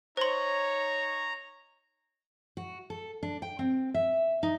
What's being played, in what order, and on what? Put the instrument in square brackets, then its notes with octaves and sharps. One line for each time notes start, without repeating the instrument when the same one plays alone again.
[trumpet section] D#4 C#5 [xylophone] C5 C6 [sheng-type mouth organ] A#5
[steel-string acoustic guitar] F#4
A4
D4
G5
C4
E5
D#4